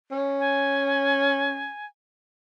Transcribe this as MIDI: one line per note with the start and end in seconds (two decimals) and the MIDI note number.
0.11 1.69 61
0.39 1.86 80